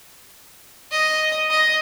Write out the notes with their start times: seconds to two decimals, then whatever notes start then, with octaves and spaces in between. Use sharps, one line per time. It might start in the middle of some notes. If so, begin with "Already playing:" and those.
0.92 D#5
1.50 D#5